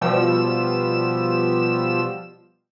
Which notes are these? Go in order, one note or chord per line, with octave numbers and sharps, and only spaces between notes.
B2 F3 G3 E6 E7